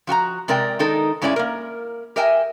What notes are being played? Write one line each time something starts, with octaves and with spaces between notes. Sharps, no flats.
F3 F#4 G5 A#5
C3 G#3 A#4 D5 G5
D#3 G#3 D#4 A4 A#4
G2 G#3 C#4 E4 D5 G#5
A#3 A#4
G4 A#4 D#5 E5 G5 G#5